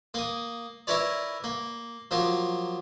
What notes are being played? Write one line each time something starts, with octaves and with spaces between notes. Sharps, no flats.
A#3 D#6
E4 A#4 B4 C#5 D5
A#3
F3 F#3 A#3